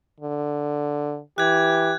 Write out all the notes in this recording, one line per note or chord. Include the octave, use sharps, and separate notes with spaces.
D3
E3 G4 F#6 G#6